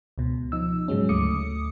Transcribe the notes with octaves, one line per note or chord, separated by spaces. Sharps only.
C#2 B2
F3 D#4 E6
G#2 C#3 F#3 G#3 C#4
D2 A3 D6 D#6 C#7